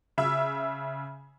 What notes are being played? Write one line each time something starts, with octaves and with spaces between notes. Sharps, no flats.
C#3 E5 E6